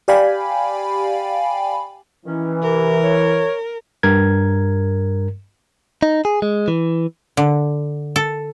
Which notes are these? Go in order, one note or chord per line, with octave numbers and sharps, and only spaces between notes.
G4 D5 F5 G5 G#5 B5
D#3 E3 C#4
F#2 C3 A#4
C#5
G2 A#4 G#6
D#4
G#4
G#3
E3
D3
A4